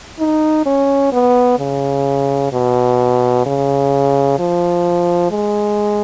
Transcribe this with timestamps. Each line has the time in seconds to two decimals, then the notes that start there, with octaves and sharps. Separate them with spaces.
0.19 D#4
0.66 C#4
1.13 B3
1.59 C#3
2.52 B2
3.46 C#3
4.39 F3
5.31 G#3